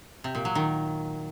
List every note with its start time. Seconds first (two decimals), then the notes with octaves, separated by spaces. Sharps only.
0.24 C3
0.35 A#2
0.45 F#3
0.55 D#3